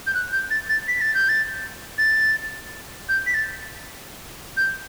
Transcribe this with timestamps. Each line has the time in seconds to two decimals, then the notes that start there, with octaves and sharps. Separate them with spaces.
0.07 G6
0.15 F#6
0.32 G6
0.50 A6
0.69 A6
0.88 B6
1.01 A6
1.14 G6
1.29 A6
1.98 A6
3.09 G6
3.26 B6
3.34 A6
4.57 G6